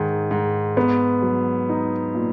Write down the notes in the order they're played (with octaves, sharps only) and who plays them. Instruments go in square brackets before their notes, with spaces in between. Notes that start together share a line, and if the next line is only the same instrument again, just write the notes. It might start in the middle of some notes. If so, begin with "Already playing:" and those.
Already playing: [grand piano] G#2 D#3
G#2
B3
F#3
D#4
A#2